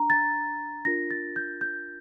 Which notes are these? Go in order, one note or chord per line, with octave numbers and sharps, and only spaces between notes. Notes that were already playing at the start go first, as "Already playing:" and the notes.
Already playing: D4 A#5
A6
D4 F4 A#4 A#6
A6
G6
G6